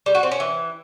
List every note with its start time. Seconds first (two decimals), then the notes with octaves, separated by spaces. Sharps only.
0.06 G3
0.15 F#4
0.23 C4
0.31 C#4
0.40 E3